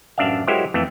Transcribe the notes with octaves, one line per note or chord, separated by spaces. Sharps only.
A1 F#2 D4 D5 E5 F5
F#3 G#3 E4 G4 A#4 C5
F2 E3 A3